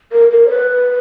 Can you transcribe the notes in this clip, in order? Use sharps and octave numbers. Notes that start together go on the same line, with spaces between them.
A#4
A#4
C#5
B4